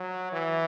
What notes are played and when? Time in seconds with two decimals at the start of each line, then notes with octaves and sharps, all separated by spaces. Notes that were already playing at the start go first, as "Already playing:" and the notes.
Already playing: F#3
0.32 E3